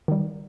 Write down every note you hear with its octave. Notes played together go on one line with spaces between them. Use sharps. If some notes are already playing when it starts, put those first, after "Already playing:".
D#3 G3